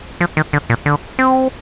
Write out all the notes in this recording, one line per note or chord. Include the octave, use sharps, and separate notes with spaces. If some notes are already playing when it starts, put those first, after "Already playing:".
F3
D#3
D3
A#2
D3
C4